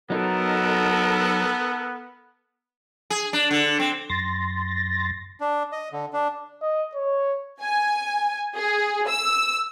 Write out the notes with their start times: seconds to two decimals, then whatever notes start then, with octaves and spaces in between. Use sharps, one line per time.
0.10 F#3 B3 D#4 A4 A#4
3.10 G#4
3.33 D4
3.51 D3
3.79 C4
4.10 F#2 C6 A6 A#6
5.40 D4
5.72 D#5
5.92 D3
6.13 D4
6.62 D#5
6.95 C#5
7.60 G#5
8.55 G#4
9.07 E6